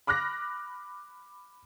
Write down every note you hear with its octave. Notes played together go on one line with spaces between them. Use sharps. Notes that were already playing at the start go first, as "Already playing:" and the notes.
B5 D6 F6 F#6 A#6